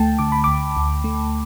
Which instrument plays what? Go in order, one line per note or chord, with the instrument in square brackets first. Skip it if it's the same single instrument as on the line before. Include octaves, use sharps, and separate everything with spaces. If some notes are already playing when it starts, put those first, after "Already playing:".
Already playing: [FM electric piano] D2 A3 G5 A5
D3 D6
B5
D2 D6
D2
A3